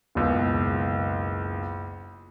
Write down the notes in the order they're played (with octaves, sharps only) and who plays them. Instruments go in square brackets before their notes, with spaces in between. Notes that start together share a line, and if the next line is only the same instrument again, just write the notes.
[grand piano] F#1 C#2 B2